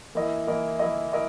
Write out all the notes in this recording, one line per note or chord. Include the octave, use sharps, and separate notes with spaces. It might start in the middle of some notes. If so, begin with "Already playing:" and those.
E3 A#3 E4 A#4 D#5
E3 A#3 E4 A#4 D#5
E3 A#3 E4 A#4 D#5
E4 A#4 D#5